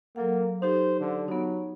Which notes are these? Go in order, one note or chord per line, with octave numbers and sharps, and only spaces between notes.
F#3 A#3 A4 F#5
D#4 G4 A4 C5
D3
F#3 B3 D#4